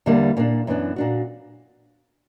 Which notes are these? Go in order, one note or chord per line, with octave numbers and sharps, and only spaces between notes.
E2 D3 G3 A#3
A#2 A#3 D4
F#2 E3 B3 D4
A#2 A#3 D4 F#4